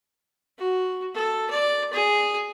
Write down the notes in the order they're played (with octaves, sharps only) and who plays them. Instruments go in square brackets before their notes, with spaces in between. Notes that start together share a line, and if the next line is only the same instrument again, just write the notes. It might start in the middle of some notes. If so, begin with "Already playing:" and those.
[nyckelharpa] F#4
A4
D5
G#4